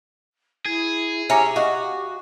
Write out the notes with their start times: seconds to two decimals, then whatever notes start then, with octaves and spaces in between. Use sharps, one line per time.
0.66 E4 G#4 G#6
1.30 C#4 G4 E5 A#5 D6
1.56 F#4 D#5 F5